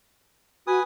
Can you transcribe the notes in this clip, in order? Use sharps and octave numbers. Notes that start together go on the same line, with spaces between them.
F#4 B4 G#5 D#6